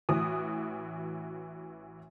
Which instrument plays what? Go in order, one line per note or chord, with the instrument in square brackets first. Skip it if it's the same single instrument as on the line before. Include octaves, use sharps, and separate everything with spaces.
[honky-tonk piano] A1 E3 F#4 D#6